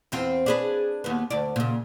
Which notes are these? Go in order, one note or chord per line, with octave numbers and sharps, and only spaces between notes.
E2 C4 F4
D4 G#4 B4
D#2 B3
D2 D5
A#2 C#3